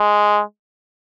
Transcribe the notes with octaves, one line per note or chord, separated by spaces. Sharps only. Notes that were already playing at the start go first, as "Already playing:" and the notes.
Already playing: G#3